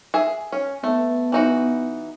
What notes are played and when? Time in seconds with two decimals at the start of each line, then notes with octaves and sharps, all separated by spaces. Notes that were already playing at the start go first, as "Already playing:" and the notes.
0.14 G#4 E5
0.52 C#4
0.84 A3 B3
1.32 E3 D#4 F#4